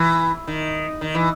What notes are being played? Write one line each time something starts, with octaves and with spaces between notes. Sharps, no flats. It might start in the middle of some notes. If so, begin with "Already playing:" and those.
Already playing: E3
D#3
D#3
E3